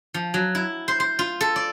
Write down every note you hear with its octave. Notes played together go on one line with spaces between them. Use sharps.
F3
F#3
E4
C5
C5
F4
A4
D5